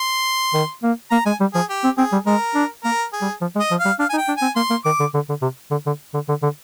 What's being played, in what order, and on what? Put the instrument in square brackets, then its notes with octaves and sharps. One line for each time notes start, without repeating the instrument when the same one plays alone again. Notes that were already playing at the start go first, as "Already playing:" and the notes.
Already playing: [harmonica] C6
[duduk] D#3
A#3
[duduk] A#3 [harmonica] A#5
[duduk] G#3 [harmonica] G#5
[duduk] G3
[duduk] F3 [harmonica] G#4
[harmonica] G4
[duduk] C4
[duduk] C4 [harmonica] G#4
[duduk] G3
[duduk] G#3 [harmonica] A#4
[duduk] D4
[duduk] A#3 [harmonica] A#4
[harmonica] G#4
[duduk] G3
F3
G#3
[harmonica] D#5
[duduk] F3
[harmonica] F5
[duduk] G3
[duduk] D4 [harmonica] F5
[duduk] D#4 [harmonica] G#5
[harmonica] G5
[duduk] D4
[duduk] C4 [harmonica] G#5
[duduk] A#3 [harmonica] C6
[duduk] A#3
[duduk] D#3 [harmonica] D6
[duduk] D3
D3
D3
C3
D3
D3
D3
D3
D3